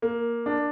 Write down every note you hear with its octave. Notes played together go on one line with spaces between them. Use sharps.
A#3
D4